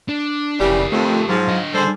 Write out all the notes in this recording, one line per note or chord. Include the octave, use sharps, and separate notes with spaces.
D4
F1 C#3 E3 G3 G4 A#4
F2 A3
G#2 F3 F#3
D3 D#5
G3 G#4 A4 C5